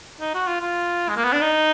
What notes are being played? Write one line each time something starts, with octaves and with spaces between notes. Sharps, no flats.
D#4
F#4
F4
F4
G#3
A#3
B3
D4
D#4